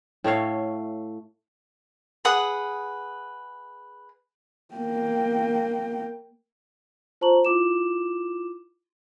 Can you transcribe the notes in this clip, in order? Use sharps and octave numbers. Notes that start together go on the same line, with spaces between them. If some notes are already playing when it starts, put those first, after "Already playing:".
A2 A3 C#5 F5
G#4 B4 F#5 D#6
A#3 G5
F4 C5 A5 A#5 C#6 F#7
E4 F4 D6 E7